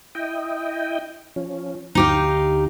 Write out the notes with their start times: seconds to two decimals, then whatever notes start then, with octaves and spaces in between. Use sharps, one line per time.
0.15 E4 D#5 G5
1.36 F3 C#4
1.95 D2 D#4 G4 F5